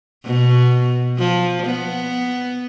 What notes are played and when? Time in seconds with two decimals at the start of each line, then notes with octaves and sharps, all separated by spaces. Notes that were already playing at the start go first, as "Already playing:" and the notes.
0.25 B2
1.17 F3
1.66 B3